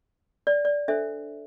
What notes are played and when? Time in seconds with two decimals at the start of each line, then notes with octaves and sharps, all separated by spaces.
0.47 D5
0.65 D5
0.88 D4 A4 C5 E5